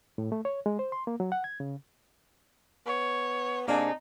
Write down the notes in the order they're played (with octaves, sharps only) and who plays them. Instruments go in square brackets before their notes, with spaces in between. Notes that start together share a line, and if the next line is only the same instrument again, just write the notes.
[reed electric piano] A2
A3
C#5
G#3
C5
C6
A#3
F#3
F#5
G#6
C#3
[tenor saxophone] B3 [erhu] C#5
[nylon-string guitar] C3 D4 G#4 [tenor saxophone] A#3 [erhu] D#4